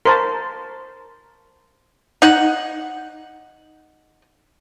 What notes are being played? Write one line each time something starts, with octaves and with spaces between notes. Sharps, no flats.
A#4 C5 A5 C6 C#6
D#4 F#5